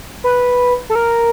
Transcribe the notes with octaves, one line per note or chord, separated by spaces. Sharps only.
B4
A4
A#4